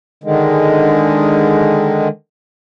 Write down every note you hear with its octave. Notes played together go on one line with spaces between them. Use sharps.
D3 D#3 G#3